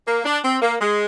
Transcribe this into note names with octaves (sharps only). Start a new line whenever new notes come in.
A#3
D4
C4
A#3
G#3